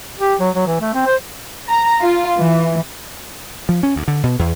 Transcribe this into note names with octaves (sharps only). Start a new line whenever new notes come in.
G4
F#3
F#3
E3
A3
C4
C5
A#5
F4
E3
F3
C#4
D2
D3
B2
E2